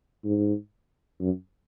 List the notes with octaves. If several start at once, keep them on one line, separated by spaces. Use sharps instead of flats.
G#2
F#2